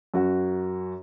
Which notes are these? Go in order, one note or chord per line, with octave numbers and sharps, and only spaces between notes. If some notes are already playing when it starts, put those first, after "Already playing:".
F#2 F#4